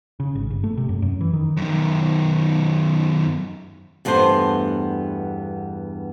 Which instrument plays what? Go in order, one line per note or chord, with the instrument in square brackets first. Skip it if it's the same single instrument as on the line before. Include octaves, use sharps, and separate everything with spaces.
[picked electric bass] C#3
G#1
G1
A3
C3
F#2
F#2
E3
D#3
[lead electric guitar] F#2 D#3
[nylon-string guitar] E2 G2 A3 B3 C5